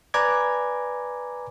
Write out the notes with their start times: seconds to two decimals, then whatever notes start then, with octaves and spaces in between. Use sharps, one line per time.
0.14 B4 D5 G#5 A#5 D6 G#6